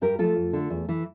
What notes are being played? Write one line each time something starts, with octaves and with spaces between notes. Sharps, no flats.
G2 G4 A#4
F3 A3 F4 A4
F2
D3 A3
E2
E3 A3